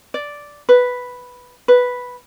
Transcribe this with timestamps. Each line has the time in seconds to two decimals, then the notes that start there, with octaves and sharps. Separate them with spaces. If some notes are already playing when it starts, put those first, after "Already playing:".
0.14 D5
0.69 B4
1.68 B4